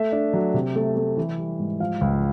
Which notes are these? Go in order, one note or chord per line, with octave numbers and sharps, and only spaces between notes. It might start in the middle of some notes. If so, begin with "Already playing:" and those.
Already playing: A3 E5
D4
F#3
C3
A3
A3
E3
G3
G#2
F3 F5
C#2